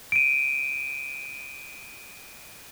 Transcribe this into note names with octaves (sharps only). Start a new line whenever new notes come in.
D7 D#7